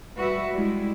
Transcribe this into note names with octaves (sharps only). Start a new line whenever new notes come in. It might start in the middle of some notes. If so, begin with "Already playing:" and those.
G3 F#4 B4 E5
G3 G#3 E4